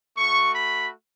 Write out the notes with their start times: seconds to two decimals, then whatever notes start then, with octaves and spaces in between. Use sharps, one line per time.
0.18 A3 F#4 C#6
0.55 B5